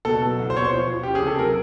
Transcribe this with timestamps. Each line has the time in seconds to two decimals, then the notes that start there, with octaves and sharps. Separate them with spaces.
0.05 B2 A4
0.22 F#3
0.39 C2
0.50 C5
0.56 B2 C#5
0.64 C5
0.72 F3
0.89 F3
1.03 C#4 G4
1.15 G#4
1.22 C3 A4
1.39 F#3 A#4